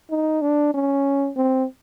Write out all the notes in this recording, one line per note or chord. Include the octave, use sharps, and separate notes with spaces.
D#4
D4
C#4
C4